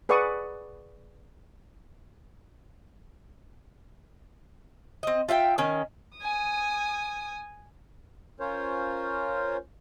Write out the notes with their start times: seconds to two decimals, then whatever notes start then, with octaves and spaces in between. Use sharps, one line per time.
0.09 G#4 B4 D5 F#5 C#6 D#6
5.03 C4 D#5
5.28 F4 E5 F#5 G5
5.58 D#3 C#4
6.18 G#5 D#6
8.40 C#4 F4 A#4 C5 C#5